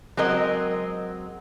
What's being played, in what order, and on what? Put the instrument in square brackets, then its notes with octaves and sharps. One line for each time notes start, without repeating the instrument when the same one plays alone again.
[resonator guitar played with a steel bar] F#3 G#3 C4 A#4 D#5